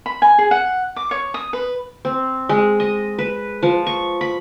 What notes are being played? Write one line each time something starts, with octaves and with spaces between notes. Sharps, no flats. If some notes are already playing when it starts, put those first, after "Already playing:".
B5
G#5
G#4
F#5
D6
C#5
D#6
B4
C4
G#3
D#5
B4
F3
C#6
B5